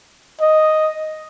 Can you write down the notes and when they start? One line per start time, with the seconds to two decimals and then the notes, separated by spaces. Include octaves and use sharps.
0.41 D#5